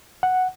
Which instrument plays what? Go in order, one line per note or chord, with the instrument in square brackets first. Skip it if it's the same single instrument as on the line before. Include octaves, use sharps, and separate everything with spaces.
[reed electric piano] F#5